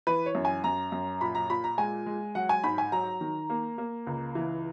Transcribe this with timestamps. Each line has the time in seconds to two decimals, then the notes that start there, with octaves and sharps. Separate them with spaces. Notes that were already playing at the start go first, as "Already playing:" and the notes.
0.07 E3 B4
0.26 C#5
0.35 F#2
0.45 G#5
0.64 F#2 A#5
0.92 F#2
1.21 A#2 B5
1.35 A#5
1.50 A#2 B5
1.64 A#5
1.78 G#3 G#5
2.06 G#3
2.35 F#3 F#5
2.49 G#5
2.64 G#2 B5
2.78 G#5
2.92 F#3 A#5
3.21 D#3
3.50 A#3
3.78 A#3
4.07 C#2
4.35 E3